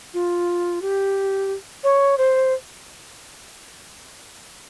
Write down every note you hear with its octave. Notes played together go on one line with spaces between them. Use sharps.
F4
G4
C#5
C5